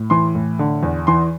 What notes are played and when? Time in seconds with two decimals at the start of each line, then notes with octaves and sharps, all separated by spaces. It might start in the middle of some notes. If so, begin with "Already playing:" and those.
Already playing: A2
0.10 E3 C6
0.35 A2
0.59 D3
0.83 E2
1.07 E3 C6